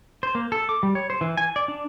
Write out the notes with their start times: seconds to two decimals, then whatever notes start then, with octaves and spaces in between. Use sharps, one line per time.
0.23 C5
0.35 A#3
0.52 A4
0.69 D6
0.83 G3
0.95 C#5
1.10 C5
1.21 E3
1.37 G#5
1.56 D5
1.68 D4